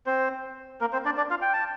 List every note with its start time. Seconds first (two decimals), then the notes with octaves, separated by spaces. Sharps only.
0.06 C4 C5
0.81 A#3 A#4
0.93 C4 C5
1.05 D4 D5
1.17 D4 D5
1.30 F4 F5
1.42 G5
1.53 A5